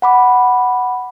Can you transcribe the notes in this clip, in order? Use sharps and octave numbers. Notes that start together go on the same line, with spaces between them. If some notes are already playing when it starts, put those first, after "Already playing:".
F#5 B5 D6